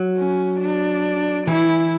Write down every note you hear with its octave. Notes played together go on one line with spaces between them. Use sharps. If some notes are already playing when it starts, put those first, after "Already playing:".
Already playing: F#3
C#4
D4
E3 E4